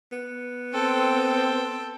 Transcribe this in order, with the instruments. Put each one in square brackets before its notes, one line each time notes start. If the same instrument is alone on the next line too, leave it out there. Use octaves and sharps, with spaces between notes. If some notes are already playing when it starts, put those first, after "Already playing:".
[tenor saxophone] B3
[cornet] C4 [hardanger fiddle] A4 G5